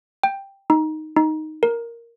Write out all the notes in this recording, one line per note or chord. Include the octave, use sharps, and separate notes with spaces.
G5
D#4
D#4
A#4